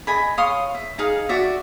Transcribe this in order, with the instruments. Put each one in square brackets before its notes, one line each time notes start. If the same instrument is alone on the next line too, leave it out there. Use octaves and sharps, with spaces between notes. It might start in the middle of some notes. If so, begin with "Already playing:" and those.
[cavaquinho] D#5 G#5 B5
C#5 F5 C6 D#6
E5
D#4 G#4 F5
F#4 D5 E5